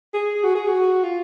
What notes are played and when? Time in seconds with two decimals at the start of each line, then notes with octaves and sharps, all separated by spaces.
0.14 G#4
0.43 F#4
0.55 G#4
0.67 F#4
1.03 F4